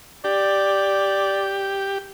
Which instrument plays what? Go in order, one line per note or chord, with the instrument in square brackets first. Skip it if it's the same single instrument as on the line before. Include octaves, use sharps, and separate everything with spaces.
[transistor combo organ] G4 [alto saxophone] D5